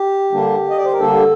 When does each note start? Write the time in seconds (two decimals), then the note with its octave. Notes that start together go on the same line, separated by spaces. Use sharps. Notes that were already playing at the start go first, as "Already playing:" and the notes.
Already playing: G4
0.32 D3 G3 A#3 D4
0.70 D#5
0.78 D5
0.85 C5
0.92 A#4
0.99 D3 G3 A#3 D4 A4